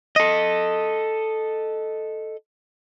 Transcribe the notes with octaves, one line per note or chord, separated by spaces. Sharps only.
A4 D#5